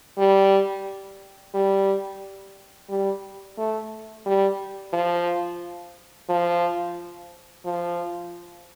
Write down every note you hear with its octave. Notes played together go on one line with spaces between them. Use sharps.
G3
G3
G3
A3
G3
F3
F3
F3